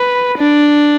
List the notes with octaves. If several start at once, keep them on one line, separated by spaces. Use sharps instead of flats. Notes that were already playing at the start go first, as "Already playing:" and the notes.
Already playing: B4
D4